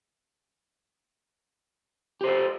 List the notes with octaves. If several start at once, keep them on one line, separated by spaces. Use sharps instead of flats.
G4 A4 C5